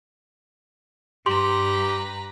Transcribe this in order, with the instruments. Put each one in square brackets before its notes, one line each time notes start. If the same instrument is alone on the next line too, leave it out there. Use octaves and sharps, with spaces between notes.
[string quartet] G2 B4 A#5 [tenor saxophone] G4 [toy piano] C6